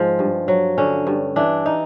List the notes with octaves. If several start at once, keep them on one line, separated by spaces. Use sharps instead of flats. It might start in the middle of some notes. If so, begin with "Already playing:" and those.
Already playing: G#2 F3 G#3
G2
F#3
D3 C#4
G2
E3 D4
D#4